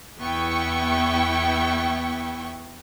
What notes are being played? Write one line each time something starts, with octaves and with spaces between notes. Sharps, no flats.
E2 B3 E4 G5 C#6